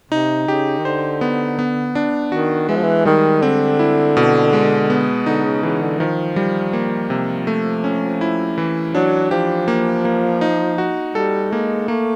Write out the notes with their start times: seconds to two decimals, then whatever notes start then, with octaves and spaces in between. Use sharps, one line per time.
0.11 C3 D#4
0.48 C#3 G4
0.79 D#3
0.85 D3 C5
1.21 B3
1.59 B3
1.95 D4
2.32 D#3 F#4
2.69 E3 G#3
2.76 F3
2.83 E3
3.05 D#3 G3
3.42 D3 C4
3.79 E4
4.17 B2
4.53 G#3
4.90 B3
5.26 D3 D#4
5.44 C#3
5.63 C#3 E3
5.81 D3
5.99 D#3 F3
6.36 G3
6.73 A#3
7.10 C3
7.47 A3
7.84 C#4
8.21 E4
8.58 E3
8.94 F#3 D4
9.31 F3 G4
9.68 A#3
10.05 A#3
10.41 D#4
10.78 F#4
11.15 G3 A4
11.52 G#3 A#3
11.88 A3 A#3